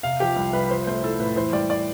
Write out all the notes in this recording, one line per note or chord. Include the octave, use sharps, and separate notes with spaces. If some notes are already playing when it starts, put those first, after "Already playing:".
C3 F5
F3 G4
C2
C2 B4
F3 C5
A3 C5
E4 A4
A2 B4
E3 C5
G3 D5
D5